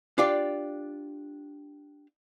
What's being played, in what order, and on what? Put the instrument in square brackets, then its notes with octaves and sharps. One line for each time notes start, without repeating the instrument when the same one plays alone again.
[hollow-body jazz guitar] D4 F4 G4 D5